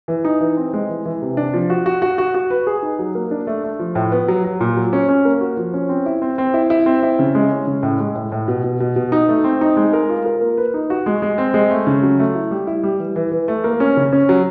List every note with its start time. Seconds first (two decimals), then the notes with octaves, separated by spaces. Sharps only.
0.08 E3
0.25 D#4
0.40 E3
0.57 C4
0.73 G#3
0.89 E3
1.06 E3
1.22 C3
1.37 D4
1.54 F3
1.70 F#4
1.86 F#4
2.02 F#4
2.18 F#4
2.34 F#4
2.50 B4
2.67 G#4
2.83 D#4
2.99 F#3
3.15 A#3
3.31 D4
3.47 A3
3.64 A3
3.79 F3
3.95 A2
4.12 B3
4.28 F#3
4.45 F#3
4.61 A#2
4.77 F#3
4.93 C#4
5.09 C#4
5.25 A#3
5.41 F#4
5.57 F3
5.74 C#4
5.89 C4
6.06 E4
6.22 C4
6.38 C4
6.54 E4
6.70 E4
6.86 C4
7.03 E4
7.19 C#3
7.35 G#3
7.51 C#4
7.67 C#3
7.83 A2
8.00 G#3
8.15 A2
8.32 A2
8.48 B2
8.64 B2
8.80 B2
8.96 B2
9.12 D#4
9.29 A3
9.44 C4
9.61 D#4
9.77 G#3
9.93 A#4
10.10 F4
10.26 A#4
10.41 A#3
10.58 B4
10.74 D#4
10.90 F#4
11.06 G#3
11.22 G#3
11.38 C4
11.54 G#3
11.71 A3
11.87 C#3
12.03 F#3
12.19 A3
12.35 E4
12.51 G3
12.67 E4
12.83 G3
13.00 E3
13.16 E3
13.32 E3
13.48 A3
13.64 A#3
13.80 C#4
13.97 C#3
14.13 C#4
14.29 F#3